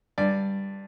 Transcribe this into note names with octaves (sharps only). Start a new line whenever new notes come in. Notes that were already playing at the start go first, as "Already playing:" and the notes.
G2 D5